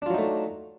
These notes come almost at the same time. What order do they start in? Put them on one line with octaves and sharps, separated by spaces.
D4 F4 F#3 D#4 A3